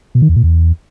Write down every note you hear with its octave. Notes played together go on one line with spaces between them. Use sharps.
B2
D#3
E2
A#2
E2